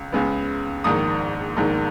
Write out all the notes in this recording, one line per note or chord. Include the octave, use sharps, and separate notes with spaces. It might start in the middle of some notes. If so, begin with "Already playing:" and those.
Already playing: C#2 C#3
C#2 C#3 G#3 B3
A#1 G#2 D#3 D#6
A#1 G#2 D#3